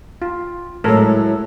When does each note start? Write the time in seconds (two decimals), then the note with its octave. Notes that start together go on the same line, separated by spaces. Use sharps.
0.22 F4
0.84 A2 F#3 G#3 A4 A#4